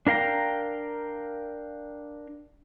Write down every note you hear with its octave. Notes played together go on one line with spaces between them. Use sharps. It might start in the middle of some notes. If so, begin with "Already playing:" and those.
D4 A#4 F5 G5 A#5